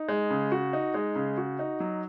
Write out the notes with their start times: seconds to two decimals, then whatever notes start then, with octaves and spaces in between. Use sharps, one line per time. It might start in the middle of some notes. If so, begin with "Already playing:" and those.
Already playing: D#4
0.09 G#3
0.30 C#3
0.52 F#4
0.73 D#4
0.94 G#3
1.15 C#3
1.37 F#4
1.59 D#4
1.80 F#3